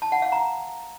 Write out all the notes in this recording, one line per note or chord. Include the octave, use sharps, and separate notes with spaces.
A5
F#5
F5
A#5